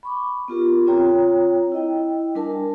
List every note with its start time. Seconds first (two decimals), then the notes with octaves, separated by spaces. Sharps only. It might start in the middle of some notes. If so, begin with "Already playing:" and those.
0.03 B5 C#6 D6
0.48 B3 F4 G4 A#4
0.87 C4 F4 C#5 G5 A#5
1.72 E4 D#5 G5
2.35 G3 D4 A#4 G#5 A5